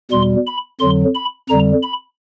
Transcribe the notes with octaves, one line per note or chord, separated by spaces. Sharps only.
E2 B2 G3 C6
B5
F2 D3 F#3 C6
B5
F2 D3 G3 A#5
B5